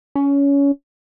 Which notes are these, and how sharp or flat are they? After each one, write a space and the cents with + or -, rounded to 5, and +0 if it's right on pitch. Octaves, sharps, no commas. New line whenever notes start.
C#4 +20